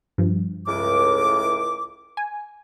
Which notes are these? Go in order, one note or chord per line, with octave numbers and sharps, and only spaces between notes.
G2 F3
C#2 A2 D6
G#5